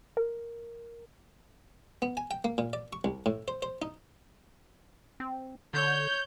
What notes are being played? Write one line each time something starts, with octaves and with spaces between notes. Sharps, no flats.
A#4
B3
G#5
G5
A#3
A#2
D5
C#6
C2
A2
C5
C5
D#4
C4
D3 C#5 G6